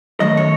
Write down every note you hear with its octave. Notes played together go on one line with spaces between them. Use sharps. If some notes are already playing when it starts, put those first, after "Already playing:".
F#2 D#3 A3 D#5
C#5